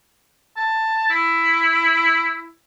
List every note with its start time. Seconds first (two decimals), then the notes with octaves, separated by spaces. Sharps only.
0.57 A5
1.10 E4